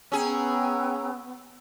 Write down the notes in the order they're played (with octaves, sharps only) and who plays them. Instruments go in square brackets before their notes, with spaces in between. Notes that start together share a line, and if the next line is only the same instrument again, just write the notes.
[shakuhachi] B3 [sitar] C#4 G#4 [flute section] G5 A#5 E6